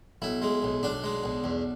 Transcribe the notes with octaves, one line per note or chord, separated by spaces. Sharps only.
B1 E4
G#3
B1
B1 D4
G#3
B1
E2